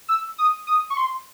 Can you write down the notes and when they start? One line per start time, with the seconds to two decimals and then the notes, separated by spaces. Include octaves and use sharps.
0.08 E6
0.38 D#6
0.67 D#6
0.90 C#6
0.97 C6